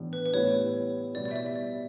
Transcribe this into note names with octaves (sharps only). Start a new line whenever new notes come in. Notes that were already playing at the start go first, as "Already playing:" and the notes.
Already playing: A2 E3 B3 D4 G4
B4
B4
A2 G3 B3 E4 C#5
B2 G3 B3 E4 D5
D5
E5
D5
E5
D5